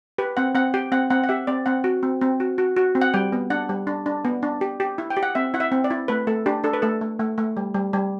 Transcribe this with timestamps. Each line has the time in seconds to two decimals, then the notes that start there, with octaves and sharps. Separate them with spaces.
0.18 G4 B4
0.37 C4 F#5
0.55 C4 F#5
0.74 G4 G5
0.92 C4 F#5
1.10 C4 F#5
1.24 F#5
1.29 G4 E5
1.47 C4 D5
1.66 C4 F#5
1.84 F#4
2.03 C4
2.21 C4
2.40 F#4
2.58 F#4
2.77 F#4
2.95 C4
3.01 F#5
3.14 G3 G5
3.32 B3
3.50 D4 F#5
3.69 G3
3.87 D4
4.06 D4
4.25 B3
4.43 D4
4.61 G4
4.80 G4
4.98 E4
5.10 G5
5.17 G4
5.23 F#5
5.35 C4 E5
5.54 E4 F#5
5.60 E5
5.72 C4
5.84 D5
5.90 E4
6.08 A3 B4
6.27 A3 A4
6.46 D4 G4
6.64 D4 A4
6.73 B4
6.82 A3 A4
7.01 A3
7.19 A3
7.38 A3
7.57 G3
7.74 G3
7.93 G3